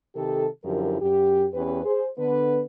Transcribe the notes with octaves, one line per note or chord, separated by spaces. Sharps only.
C3 D#3 G4 A4
F#2 D3 F3 E4 G4 A#4
F#2 G4
E2 C#4 G4 B4
G#4 C5
D3 B3 B4